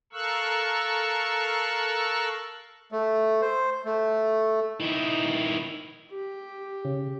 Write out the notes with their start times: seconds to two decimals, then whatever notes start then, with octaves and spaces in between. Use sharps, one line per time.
0.13 A4 A#4 F5 C#6 E6 F#6
2.92 A3
3.41 C5
3.85 A3
4.80 D#3 E4
6.12 G4
6.85 C#3